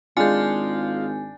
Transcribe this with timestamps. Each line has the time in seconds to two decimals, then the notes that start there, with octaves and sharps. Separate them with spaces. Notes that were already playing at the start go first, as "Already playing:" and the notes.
0.17 G#1 G#3 D4 F4 G#5 G6